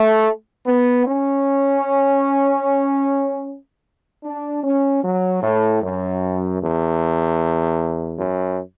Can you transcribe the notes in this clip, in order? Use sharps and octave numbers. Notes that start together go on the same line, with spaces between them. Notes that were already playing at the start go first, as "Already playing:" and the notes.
Already playing: A3
B3
C#4
D4
C#4
F#3
A2
F#2
E2
F#2